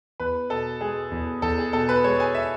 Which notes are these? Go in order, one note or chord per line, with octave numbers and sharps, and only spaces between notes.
E2 B4
B2 A4
G#3 G#4
E2
E2 A4
G#4
B2 A4
B4
G#3 C#5
G#5
E5